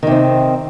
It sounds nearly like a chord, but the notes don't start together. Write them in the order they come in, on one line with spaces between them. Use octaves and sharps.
D#3 C3 C4